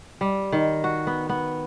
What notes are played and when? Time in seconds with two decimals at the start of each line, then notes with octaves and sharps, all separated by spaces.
0.21 G3
0.52 D#3
0.84 F#4
1.07 B3
1.29 B3